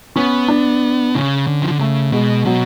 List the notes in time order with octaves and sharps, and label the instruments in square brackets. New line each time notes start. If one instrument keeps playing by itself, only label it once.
[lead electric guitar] B3 [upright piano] C#4
[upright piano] D4
[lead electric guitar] C#3 [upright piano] C#4
[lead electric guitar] D3
F3
D3
[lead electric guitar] C#3 [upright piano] A3
[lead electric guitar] B2 [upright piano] G#3
[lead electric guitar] B2 [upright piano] F#3